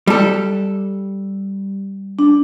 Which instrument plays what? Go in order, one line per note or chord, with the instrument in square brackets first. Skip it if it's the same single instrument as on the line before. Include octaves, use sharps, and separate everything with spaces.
[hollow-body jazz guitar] G3 A4
[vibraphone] D4